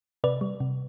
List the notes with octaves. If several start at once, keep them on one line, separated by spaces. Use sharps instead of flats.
C3 B4 D5
G3
C3